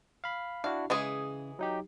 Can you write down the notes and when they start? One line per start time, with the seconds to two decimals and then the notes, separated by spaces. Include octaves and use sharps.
0.24 F5 B5
0.64 D4 E4 F#4 F5
0.90 C#3 E3 G#3 G#4
1.59 F#3 D#4 G4